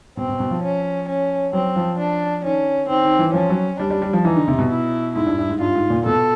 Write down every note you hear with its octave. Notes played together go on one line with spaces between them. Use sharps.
B2 C4
B2
B2
F3
C#4
C#4
F#3 C4
F3
D4
D#3 C#4
D#3 C4
D#3
E3
F3 C#4
F#3
G3 D4
G3
G3
F3
E3 D#4
D3
C3
B2
E4
G#2 E4
G2
G2
G#2
G2 F4
G#2
A#2
B2 A4